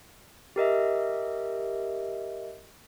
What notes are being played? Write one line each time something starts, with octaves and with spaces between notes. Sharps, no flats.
G4 A#4 D#5 E5